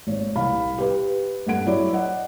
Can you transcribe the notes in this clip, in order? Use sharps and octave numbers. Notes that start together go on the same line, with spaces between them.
G#1 C#5
C2 F5 B5
G4 B4
G2 A3 F#5 D7
F#3 E4 C#5 D5
D5 D#5 F#5